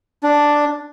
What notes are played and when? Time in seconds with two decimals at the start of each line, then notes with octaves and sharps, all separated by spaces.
0.23 D4